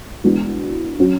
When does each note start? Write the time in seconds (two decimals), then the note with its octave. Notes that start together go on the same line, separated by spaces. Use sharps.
0.24 E3 G#3 B3 D4 F#4
0.99 F#3 C#4 F#4